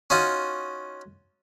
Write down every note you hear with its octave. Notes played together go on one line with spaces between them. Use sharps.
C#4 D#4 F4 F#4